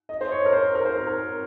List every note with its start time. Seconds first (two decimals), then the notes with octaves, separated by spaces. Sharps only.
0.09 D#5
0.21 C5
0.32 C#5
0.46 A#4
0.52 C5
0.75 A#4
0.85 C5
0.95 A#4
1.07 A#4